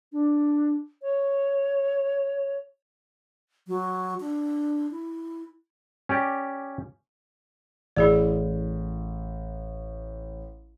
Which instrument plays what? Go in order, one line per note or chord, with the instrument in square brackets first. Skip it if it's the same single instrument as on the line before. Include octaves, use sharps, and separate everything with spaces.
[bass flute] D4
C#5
F#3
D4
E4
[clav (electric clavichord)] C#4 G4 D5
[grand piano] A1 [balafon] E4 G#4 D5